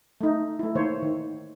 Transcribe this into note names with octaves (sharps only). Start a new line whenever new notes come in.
A3 D#4
A3 E4
D#3 A#3 C5 C#5
D#3